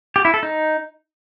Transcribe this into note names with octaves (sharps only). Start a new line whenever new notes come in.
G4
E4
A4
D#4